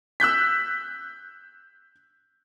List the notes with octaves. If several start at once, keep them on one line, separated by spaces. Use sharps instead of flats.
E6 F#6 G6 B6